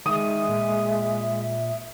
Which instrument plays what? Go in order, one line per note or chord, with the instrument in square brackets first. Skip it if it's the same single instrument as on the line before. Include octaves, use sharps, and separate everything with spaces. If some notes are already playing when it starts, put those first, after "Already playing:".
[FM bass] D#3 [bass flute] G#3 [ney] E5 [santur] D#6
[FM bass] A#2